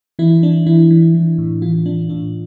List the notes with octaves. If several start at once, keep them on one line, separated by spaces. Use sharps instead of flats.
E3 E4
E3 D4
E3 E4
E3
E3
A2
E3 F4
E3 D4
A2 D4